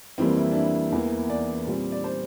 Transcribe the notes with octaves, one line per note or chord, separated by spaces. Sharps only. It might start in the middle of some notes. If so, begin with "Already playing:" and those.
F2 E3 G3 A#3 C4
E4
D4
E4
E2 E3 A#3
D5
A#2 G3 C4
D5
C5